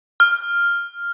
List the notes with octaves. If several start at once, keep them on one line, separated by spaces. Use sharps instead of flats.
F6